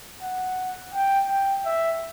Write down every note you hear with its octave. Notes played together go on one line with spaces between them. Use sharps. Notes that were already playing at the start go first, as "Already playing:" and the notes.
F#5
G5
G5
E5